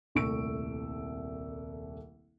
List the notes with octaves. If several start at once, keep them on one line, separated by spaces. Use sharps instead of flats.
D#1 C2 A3 C#6 E6 D7